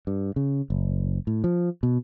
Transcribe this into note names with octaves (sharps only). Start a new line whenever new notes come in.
G2
C#3
F#1
A2
F3
B2